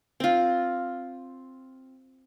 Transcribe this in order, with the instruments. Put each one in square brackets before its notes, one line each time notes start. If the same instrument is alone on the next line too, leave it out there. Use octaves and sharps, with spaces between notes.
[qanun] C4 F4